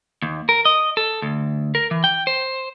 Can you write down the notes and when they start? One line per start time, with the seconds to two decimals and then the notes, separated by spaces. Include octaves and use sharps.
0.22 D#2
0.49 A#4
0.65 D#5
0.97 A4
1.22 D2
1.75 A#4
1.91 E3
2.04 G5
2.27 C5